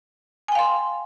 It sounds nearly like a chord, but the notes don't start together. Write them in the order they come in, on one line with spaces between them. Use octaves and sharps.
G#5 G5 F5 C6